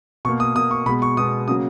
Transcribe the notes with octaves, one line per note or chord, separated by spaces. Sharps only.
B2 A#3 C#6
D#6
B2 A#3 D#6
C#6
B2 G#3 B3 B5
C#6
B2 G#3 B3 D#6
C#3 F#3 A#3 D#6